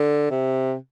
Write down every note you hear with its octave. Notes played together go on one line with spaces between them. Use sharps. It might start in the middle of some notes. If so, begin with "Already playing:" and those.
Already playing: D3
C3